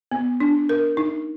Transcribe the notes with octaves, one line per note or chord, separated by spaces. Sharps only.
B3
D4
A#4
D#4